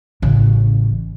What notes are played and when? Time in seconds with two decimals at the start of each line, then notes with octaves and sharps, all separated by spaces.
0.22 A1 C#3